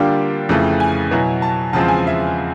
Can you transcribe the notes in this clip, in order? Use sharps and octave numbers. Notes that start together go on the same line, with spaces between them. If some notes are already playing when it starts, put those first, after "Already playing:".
Already playing: D3 G3 A#3 D4 F4 G5
F2 C#3 E3 A3
G#5
B2 F#3 B3 E4
A5
E2 C#3 F3 G#3 C4 A5
G#5
E5